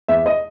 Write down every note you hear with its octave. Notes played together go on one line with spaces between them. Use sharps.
E2 E5
D#5